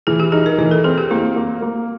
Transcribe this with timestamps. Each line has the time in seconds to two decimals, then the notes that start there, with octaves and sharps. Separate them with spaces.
0.07 E3 G#4
0.20 G4
0.32 D#4 G#4
0.46 A#4
0.58 E3 A#4
0.71 A4
0.84 C4 G#4
0.98 G4
1.11 A#3 E4
1.36 A#3
1.62 A#3